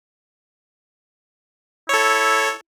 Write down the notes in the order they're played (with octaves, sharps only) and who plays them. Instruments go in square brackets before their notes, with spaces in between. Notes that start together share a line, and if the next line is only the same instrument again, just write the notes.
[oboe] E4 [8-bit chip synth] A4 C#5